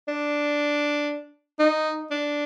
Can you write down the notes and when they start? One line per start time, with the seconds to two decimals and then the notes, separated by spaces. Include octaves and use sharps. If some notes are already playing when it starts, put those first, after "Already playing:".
0.08 D4
1.59 D#4
2.11 D4